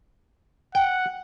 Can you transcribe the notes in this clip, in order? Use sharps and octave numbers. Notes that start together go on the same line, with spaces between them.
F#5 G5